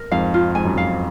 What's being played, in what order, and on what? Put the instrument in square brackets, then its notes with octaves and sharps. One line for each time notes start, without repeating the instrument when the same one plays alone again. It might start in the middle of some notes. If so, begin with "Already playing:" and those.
Already playing: [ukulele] A#4
[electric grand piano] F2 G#2 [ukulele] F5
[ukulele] F4
[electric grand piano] G#2 [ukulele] G#5
[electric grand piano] F#2
[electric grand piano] F2 [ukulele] F5